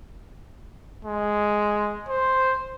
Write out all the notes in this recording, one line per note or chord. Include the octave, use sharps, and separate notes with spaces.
G#3
C5